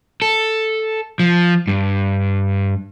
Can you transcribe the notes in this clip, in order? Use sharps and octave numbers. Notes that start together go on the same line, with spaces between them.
A4
F3
G2